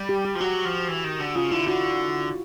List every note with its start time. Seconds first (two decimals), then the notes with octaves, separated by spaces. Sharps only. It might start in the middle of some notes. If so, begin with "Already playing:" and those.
Already playing: G3
0.09 G4
0.25 G4
0.35 F3
0.40 F#3 F#4
0.65 F3
0.88 E3
1.04 D#3
1.20 D3
1.35 C#3 F4
1.51 D3 E4
1.67 D3 F#4